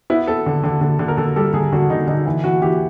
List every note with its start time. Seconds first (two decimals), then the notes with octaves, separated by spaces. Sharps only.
0.10 B3 E4
0.27 B3 A4
0.46 D3
0.63 D3
0.81 D3
0.99 D3
1.08 A#4
1.17 D3 A4
1.36 G3 A4
1.53 D3 G#4
1.72 D3 F#4
1.90 D3 D#4
2.07 D3 D#4
2.26 E3
2.44 E3 F#4
2.62 E3 G4